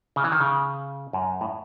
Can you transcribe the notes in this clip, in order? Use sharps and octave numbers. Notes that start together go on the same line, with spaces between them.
C#3
E3
D#3
C#3
F#2
A2